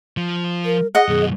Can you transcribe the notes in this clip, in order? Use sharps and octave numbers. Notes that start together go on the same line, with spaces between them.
F3
A#4
G#4 D#5 F#5
F#2 B2 G#4